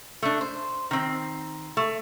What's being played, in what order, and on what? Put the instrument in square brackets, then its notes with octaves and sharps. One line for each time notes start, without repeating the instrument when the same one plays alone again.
[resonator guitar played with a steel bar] A3 D4
C5
D#3 C4
A3